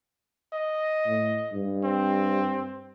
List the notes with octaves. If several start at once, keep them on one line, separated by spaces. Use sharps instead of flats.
D#5
A2
G2
C4